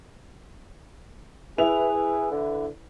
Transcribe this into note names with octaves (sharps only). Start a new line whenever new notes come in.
E4 G#4 B4 F7
D3